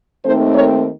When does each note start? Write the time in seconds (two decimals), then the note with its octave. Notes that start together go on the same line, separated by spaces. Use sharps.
0.25 D#2 D#3 A3 C4 A4 C5
0.55 A#4 C#5